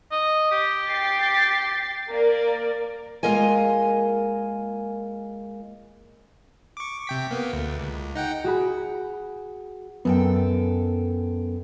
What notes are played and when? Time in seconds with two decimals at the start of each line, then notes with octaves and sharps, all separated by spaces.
0.12 D#5
0.52 G4
0.88 G5 A6 C7
2.09 A#3 A#4 D5
3.23 G#3 A#3 F4 A#4 D#5 G#5
6.77 C#6 D6
7.07 C3 G5 B6
7.31 A#3 B3
7.53 D2
7.79 C#2
8.15 D#4 F#5 G5
8.44 F#4 G#4 B5
10.05 F#2 B3 A4 G5